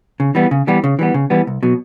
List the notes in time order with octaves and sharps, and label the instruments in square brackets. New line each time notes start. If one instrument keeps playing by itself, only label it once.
[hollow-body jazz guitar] C#3
E3 G3 B3
C#3
E3 G3 B3
C#3
E3 G3 B3
C#3
E3 G3 B3
C2
B2 F#3